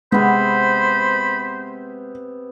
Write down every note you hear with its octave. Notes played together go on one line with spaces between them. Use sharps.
C3 G#3 B3 C5 B5